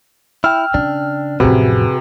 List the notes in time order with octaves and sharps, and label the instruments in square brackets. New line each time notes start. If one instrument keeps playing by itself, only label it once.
[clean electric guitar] E4 [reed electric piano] G5 E6 [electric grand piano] F6
[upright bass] C#3 [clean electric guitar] D4
[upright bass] A1 F2 [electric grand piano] C3 [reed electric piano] F#4 [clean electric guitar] G#4 B4